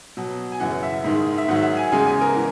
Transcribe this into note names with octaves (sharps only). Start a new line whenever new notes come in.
B2 F#3
G#5
F#2 C#3 E3 F#5
E5
G#2 D#3 G#3
E5
G#2 D#3 F#3 F#5
E5
F#5
G#5
E2 C#3 G#3 G#5
G#5
A#4
E3